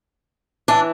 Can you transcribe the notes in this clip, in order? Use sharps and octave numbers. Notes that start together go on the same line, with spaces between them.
E3 D4